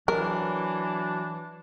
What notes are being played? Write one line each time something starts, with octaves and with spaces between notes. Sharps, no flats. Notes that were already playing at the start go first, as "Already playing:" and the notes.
E3 F#3 D4 A#4